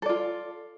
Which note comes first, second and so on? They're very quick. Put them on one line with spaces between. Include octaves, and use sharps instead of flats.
A4 D5 F4